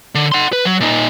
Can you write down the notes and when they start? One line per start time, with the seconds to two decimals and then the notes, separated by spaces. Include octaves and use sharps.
0.15 D3
0.32 F#5 C6
0.53 B4
0.65 F#3
0.80 A#2 D#4